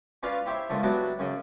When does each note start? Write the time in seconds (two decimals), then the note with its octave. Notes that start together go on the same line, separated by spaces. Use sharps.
0.23 C#4 F4 B4 D5 F5
0.46 E4 G4 C5 C#5 E5
0.70 C#2 A#2 D3 A3
0.83 F#3 G3 B3 D4 E4 F#4
1.19 F#2 C#3 F#3